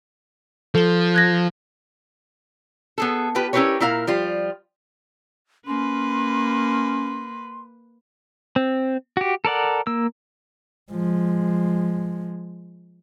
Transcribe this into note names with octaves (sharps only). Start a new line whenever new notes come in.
F3 A4 G7
F#6 G#6 A#6
B3 G#4 A4
F4 G4 B4
C#4 E4 G4 A#4 B4 C#5
A#2 E4 A#4 F5
F3 G3 F4
A#3 C#4 B4 C6
C4
F#4 G4
A4 A#4 D5 F#5
A#3 E6
F3 G#3